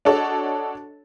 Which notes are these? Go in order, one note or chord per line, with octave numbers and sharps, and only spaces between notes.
D4 F#4 A4 C#5 D#5